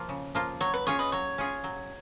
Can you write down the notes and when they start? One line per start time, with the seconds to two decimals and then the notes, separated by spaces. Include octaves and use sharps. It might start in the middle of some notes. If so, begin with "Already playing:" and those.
Already playing: F3 A#3 F4
0.09 C#3
0.35 F3 A#3 F4
0.61 F#3 C#5
0.74 B4
0.87 C#4 F4 G#4 C#5
0.99 B4 D#5
1.12 F#3 C#5
1.38 C#4 F4 G#4
1.64 F#3